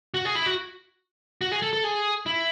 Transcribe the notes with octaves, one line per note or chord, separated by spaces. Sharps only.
F#4
G#4
E4
F#4
F#4
G#4
A4
A4
G#4
E4